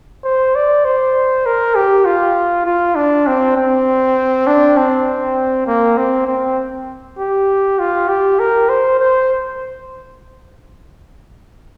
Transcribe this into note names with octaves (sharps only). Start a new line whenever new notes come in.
C5
D5
C5
A#4
G4
F4
F4
D4
C4
C4
D4
C4
A#3
C4
C4
G4
F4
G4
A#4
C5
C5